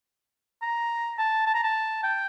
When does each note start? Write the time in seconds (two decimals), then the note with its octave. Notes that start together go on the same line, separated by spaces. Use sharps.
0.62 A#5
1.19 A5
1.47 A5
1.55 A#5
1.63 A5
2.04 G5